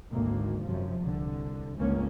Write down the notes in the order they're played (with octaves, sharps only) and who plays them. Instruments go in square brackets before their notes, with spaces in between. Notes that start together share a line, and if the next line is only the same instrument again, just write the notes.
[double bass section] G#1 D2 D#3 A#3
F#2 C3 F3
C2 D3
G1 C#2 G#2 F3 A#3 C#4